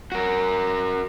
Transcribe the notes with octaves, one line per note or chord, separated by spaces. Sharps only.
F#4 A#4